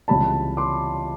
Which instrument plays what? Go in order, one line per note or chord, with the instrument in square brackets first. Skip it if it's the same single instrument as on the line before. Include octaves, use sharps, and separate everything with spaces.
[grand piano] C#2 C3 E3 G3 A5 B5
C6 D6